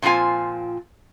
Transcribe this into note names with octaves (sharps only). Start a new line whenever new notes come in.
A#2 F3 C4 F4 G#5